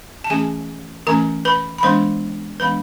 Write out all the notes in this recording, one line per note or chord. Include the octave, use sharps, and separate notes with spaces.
A5
E3 A3 C#4 G#4 G#5
E3 A3 C#4 A#4 A#5
B4 B5
B5
E3 G#3 B3 D4 C5 C6
E3 G#3 B3 D4 B4 B5